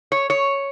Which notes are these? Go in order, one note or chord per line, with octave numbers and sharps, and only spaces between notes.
C#5
C#5